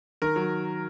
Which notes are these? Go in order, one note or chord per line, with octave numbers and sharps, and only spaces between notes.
D#3 A#4
F#3